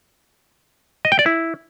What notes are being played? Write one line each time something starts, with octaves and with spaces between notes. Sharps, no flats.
D#5
G5
D5
E4